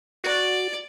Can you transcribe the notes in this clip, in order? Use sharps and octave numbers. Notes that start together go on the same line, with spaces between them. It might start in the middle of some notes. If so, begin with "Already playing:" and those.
F#4 D5